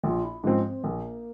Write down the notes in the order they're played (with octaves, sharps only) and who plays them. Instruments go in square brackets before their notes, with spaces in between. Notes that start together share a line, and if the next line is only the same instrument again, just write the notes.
[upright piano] A#1 [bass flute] F4
[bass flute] E4
[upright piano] G#2 F3 C4 [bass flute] C#4
[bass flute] C4
[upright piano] A#1 [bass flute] A#3